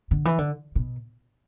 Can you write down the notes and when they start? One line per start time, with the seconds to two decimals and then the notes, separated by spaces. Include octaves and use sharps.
0.11 D3
0.25 E3
0.38 D3
0.76 B2